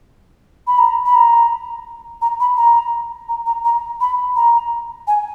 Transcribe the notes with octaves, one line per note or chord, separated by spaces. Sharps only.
B5
A#5
B5
A#5
A#5
B5
A#5
A#5
A#5
A#5
B5
A#5
G#5